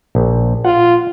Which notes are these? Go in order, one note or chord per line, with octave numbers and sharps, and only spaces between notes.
A#1
F4 F#5